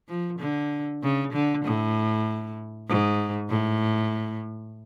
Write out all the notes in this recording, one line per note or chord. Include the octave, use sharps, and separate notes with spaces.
F3
D3
C#3
D3
A2
G#2
A2